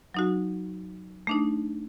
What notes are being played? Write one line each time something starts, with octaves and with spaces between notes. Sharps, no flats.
F#3 D#4 F#4
A3 D4 D#4